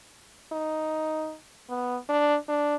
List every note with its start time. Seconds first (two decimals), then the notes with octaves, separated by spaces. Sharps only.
0.52 D#4
1.69 B3
2.09 D4
2.48 D4